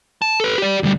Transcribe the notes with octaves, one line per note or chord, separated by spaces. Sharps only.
A5
A4 B4
G4 D5
D2 G3